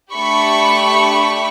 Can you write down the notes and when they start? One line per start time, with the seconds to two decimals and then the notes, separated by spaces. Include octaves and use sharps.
0.13 A3 D4 G4 B5 C#6